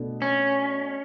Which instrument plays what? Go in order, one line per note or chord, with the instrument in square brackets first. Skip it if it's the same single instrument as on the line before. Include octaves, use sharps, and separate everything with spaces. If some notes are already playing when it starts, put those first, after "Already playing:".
Already playing: [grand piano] B2 A3 D4
[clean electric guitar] C#4